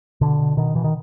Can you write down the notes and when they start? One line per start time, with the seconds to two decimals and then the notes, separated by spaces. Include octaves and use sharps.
0.21 B2 D3
0.39 B2
0.57 B2 D#3
0.75 B2 E3
0.84 D#3